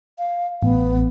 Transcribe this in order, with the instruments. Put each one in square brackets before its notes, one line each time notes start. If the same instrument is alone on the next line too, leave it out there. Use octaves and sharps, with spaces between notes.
[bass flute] F5
[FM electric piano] A1 [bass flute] B3